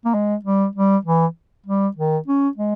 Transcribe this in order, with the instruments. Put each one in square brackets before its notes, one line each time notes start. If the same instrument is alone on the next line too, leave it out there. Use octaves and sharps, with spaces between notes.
[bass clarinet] A#3
G#3
G3
G3
E3
G3
D#3
C#4
G#3